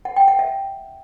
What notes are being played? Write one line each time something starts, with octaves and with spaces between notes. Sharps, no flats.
F#5
G5
F#5
E5